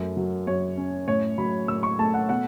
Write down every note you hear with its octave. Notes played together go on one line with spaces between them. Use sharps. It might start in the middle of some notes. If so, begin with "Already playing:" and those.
Already playing: F#2 A3
F#3
F#2 C#5
C#4
A2 C#5
F#3 B5
A2 E6
C#6
A3 A5
F#5
B2 F#5